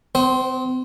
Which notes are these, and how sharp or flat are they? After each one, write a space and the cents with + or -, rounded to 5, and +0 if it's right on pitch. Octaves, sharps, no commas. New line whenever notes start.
C4 -40 C5 +0